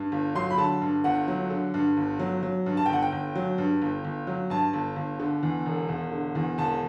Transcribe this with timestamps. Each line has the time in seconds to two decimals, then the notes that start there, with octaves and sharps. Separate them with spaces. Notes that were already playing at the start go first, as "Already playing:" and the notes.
Already playing: G2
0.12 G1
0.35 F#3 C6
0.50 B5
0.58 D3 A5
0.82 G2
1.04 G1 F#5
1.28 F#3
1.50 D3
1.74 G2
1.97 G1
2.20 F#3
2.43 F#3
2.66 G2
2.77 A5
2.86 G5
2.89 G1 F#5
3.02 G5
3.12 G1
3.35 F#3
3.58 G2
3.82 G1
4.04 G1
4.27 F#3
4.50 G2 A5
4.73 G1
4.96 G1
5.20 D3
5.43 E2
5.66 E1
5.89 E1
6.12 D3
6.35 E2
6.58 E1 A5